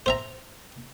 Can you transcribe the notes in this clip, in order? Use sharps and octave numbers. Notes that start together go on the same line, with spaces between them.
C5 E5 A#5